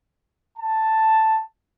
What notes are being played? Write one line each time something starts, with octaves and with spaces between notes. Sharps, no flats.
A5